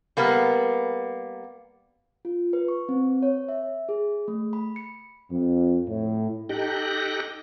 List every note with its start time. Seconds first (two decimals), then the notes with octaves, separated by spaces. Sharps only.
0.17 G3 A#3 B3
2.25 F4
2.53 B4
2.68 C#6
2.89 C4
3.22 C#5
3.48 E5
3.89 G#4
4.28 A3
4.53 B5
4.76 C#7
5.30 F2
5.88 A2
6.49 D#4 G4 A4 G5 F#6 A#6